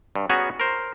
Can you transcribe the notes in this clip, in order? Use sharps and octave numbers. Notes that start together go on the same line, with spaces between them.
G2
B3 C#4 F#4 G#4 G#5 A#5
A#4 C5